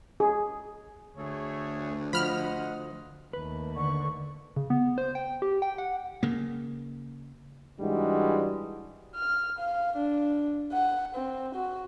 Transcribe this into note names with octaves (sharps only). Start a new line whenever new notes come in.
G#4
D2 A3 G#4 C#5
F3 C5 D#5 F#5 B5 F6
D#2 A3 B4
D3 C#6
C#3
B3
C5
G5
G4
G5
F#5
C#3 A#3
G#2 E3 G3 G#3 D4 F#4
F6
F5
D4
F#5
C4
F#4